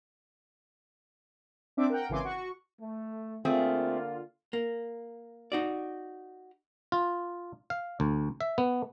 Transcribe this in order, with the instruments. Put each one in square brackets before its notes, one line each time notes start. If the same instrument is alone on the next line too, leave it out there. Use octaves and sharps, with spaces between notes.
[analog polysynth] C4 D4 E5 D6
A#4 F#5 G5
G#1 C#3 E3 G#5 C6 D6
F#4 C#6
[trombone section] A3
[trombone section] D3 A#3 F4 [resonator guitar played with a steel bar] A3 C4 G#4
[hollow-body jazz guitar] A#3
D#4 F#4 D5
[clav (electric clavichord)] F4
F5
D2
E5
B3